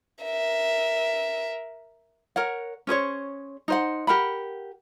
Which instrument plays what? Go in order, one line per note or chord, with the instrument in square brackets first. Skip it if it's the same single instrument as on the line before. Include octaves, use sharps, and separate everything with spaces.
[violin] A#4 E5
[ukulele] A#4 C#5 F#5
C#4 G#4 C5 C#5
D#4 C5 F#5
G4 A#4 F#5 B5